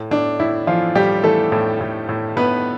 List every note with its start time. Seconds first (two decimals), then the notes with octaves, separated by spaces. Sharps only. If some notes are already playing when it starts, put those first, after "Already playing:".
Already playing: A2
0.11 A2 D4
0.39 A2 E4
0.67 E3 F3 F4
0.95 A2 G3 G4
1.23 E3 A3 A4
1.52 A2
1.80 A2
2.09 A2
2.36 A2 B3 B4